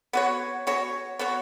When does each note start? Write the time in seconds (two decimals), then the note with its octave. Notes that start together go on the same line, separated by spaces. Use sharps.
0.13 B3 F#4 C#5
0.67 B3 F#4 C#5
1.19 B3 F#4 C#5